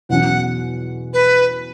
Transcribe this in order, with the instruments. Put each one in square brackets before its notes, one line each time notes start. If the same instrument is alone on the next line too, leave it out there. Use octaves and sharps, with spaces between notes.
[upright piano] E2 B2 F#3 C#4 [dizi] F#5
[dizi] B4